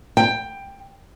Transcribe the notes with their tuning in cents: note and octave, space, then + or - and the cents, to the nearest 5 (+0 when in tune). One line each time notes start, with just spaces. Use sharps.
G5 +15